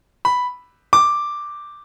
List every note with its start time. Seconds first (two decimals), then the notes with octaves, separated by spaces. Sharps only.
0.25 B5
0.93 D6